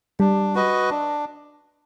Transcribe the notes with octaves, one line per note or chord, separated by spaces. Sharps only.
G3 D4
F#4 B4 D#5
D4